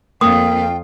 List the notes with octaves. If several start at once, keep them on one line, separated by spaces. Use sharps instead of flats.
F2 A#3 F4 G5 D#6